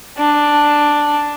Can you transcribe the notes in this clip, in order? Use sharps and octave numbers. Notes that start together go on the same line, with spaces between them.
D4